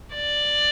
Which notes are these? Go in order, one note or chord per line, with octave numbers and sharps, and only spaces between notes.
D5